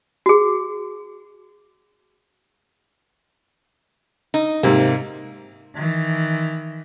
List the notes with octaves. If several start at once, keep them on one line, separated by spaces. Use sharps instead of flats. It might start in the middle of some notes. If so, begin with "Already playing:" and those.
F#4 G#4
D#4
G#2 C3 A#3
D#3 E3